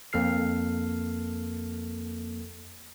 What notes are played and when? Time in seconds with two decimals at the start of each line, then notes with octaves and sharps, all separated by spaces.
0.13 F2 A#3 A4 F6 C7